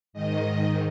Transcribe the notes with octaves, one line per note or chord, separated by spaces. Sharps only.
G#2 D#3 D#5